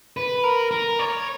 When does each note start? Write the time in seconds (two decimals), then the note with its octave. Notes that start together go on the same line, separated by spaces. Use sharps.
0.17 B4
0.44 A#4
0.71 A#4
0.99 C#5